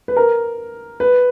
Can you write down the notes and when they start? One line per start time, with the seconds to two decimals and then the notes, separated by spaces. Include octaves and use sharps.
0.08 B4
0.16 A#4
1.00 B4